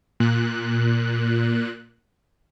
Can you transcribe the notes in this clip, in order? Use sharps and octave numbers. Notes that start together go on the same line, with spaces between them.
A#2 F#6